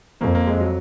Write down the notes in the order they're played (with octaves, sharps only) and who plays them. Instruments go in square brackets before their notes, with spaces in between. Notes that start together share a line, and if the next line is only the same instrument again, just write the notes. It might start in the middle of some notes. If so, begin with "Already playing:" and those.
[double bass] F2 [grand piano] A#3
[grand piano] A#3
G#3
F#3